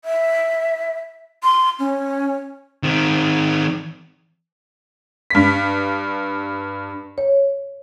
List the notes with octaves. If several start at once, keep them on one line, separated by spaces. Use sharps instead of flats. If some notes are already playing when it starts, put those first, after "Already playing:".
E5
C6
C#4
D#3 C4
G2 B6
C#5